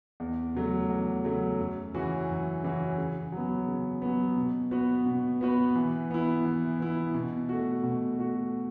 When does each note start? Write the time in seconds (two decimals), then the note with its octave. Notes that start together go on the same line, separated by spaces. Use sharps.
0.20 E2
0.54 C#3 F#3 A3
0.90 E2
1.24 C#3 F#3 A3
1.59 F#2
1.94 C#3 E3 C#4 F#4
2.28 F#2
2.63 C#3 E3 C#4 F#4
2.97 C#3
3.32 F#3 B3
3.67 C#3
4.02 F#3 B3
4.37 B2
4.71 B3 F#4 B4
5.06 B2
5.41 B3 F#4 B4
5.76 E3
6.10 B3 E4
6.45 E3
6.80 B3 E4
7.14 B2
7.49 A3 F#4
7.84 B2
8.19 A3 F#4